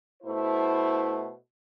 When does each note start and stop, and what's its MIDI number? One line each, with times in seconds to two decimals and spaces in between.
0.23 1.31 47
0.23 1.31 57
0.23 1.31 64
0.23 1.31 72